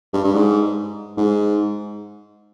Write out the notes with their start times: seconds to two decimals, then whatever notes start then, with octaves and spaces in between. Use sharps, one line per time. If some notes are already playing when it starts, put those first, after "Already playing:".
0.14 G2
0.24 G2
0.34 G#2
1.17 G#2